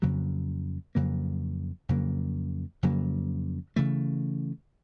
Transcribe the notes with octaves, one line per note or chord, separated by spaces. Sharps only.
F2 C#3 F#3 A#3
F2 C#3 F#3 A#3
F2 C#3 F#3 A#3
F2 C#3 F#3 A#3
C#3 E3 A3